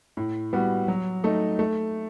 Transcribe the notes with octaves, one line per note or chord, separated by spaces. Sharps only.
A2
G3 B3 F#4
F#3
A3 D#4
A3